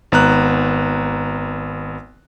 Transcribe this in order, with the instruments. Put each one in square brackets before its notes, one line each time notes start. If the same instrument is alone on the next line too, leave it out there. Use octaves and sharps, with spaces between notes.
[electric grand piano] G#1 B3 A#5 F#6